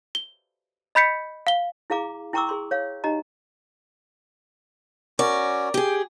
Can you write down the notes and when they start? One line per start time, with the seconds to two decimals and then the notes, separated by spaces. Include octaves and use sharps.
0.15 G7
0.95 D#5 B5 G6 B6 C#7
1.47 F5 G7
1.90 E4 G#4 F5 A#5 D6
2.33 E4 G5 A#5 C#6 D6 E6
2.47 G#4 C6 C#6
2.71 C#5 F5
3.04 D#4 G4 D#5 A#5
5.19 C#4 F#4 A#4 D5
5.74 G4 G#4 G5